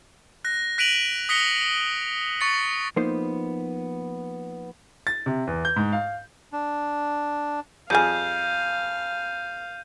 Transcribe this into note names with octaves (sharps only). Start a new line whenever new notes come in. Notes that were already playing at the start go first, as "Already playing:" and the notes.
F#6 A#6
F#6 B6 D7 D#7 F7 F#7
D#6 A#6 B6 C#7 G7
C#6 A6 C#7
F3 A#3 B3 D#4 C5
A6
C3
E2
G6
G#2
F5
D4
F2 G3 G#4 F5 G#5 F6 G6 D#7